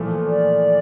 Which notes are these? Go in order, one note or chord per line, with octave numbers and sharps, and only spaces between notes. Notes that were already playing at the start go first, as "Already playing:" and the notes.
Already playing: A#2 E3 F3 A3
D5